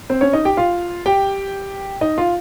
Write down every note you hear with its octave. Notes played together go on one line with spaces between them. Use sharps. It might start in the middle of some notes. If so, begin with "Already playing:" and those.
C4 C5
C#4 C#5
D#4 D#5
G4 G5
F4 F5
G4 G5
D#4 D#5
F4 F5